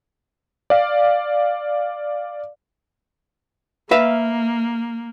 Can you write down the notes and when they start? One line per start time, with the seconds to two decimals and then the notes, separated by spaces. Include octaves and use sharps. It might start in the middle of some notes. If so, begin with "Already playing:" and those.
0.70 D5 F5
3.91 A#3 B4 E5 F5